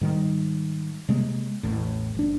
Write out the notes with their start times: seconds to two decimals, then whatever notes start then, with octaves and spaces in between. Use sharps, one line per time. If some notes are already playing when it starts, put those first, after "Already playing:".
0.01 G#2 D#3 G3
1.09 C3 G#3 A#3
1.63 A1 E2 A2
2.15 F#1 D4